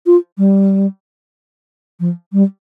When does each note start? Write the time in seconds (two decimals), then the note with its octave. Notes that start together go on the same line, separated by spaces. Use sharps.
0.06 F4
0.38 G3
2.00 F3
2.33 G3